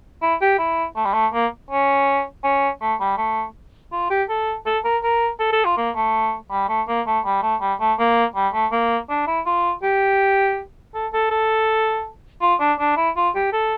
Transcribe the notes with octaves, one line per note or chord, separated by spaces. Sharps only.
E4
G4
E4
A3
G3
A3
A#3
C#4
C#4
A3
G3
A3
F4
G4
A4
A4
A#4
A#4
A4
A4
F4
A#3
A3
G3
A3
A#3
A3
G3
A3
G3
A3
A#3
G3
A3
A#3
D4
E4
F4
G4
A4
A4
A4
F4
D4
D4
E4
F4
G4
A4